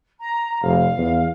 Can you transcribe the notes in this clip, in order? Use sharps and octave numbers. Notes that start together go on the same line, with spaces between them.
A#5
F1 F5
E2